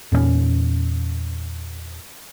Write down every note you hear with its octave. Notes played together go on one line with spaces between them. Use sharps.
E2 A#2 A#3 C#4